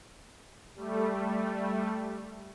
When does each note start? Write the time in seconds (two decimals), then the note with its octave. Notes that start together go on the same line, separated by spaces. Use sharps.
0.75 G3 A3